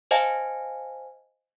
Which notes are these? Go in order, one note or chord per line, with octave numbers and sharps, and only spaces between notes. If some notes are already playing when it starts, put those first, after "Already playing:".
C5 D#5 F5 G#5 A5